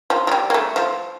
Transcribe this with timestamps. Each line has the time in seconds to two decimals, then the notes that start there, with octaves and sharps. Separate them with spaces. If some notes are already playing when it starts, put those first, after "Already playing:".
0.10 F3
0.27 F3
0.32 G3
0.50 A#3
0.54 A3
0.76 F3